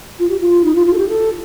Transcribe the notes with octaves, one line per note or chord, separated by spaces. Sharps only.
F4
G4
F4
D#4
F4
F4
A4
G4
A4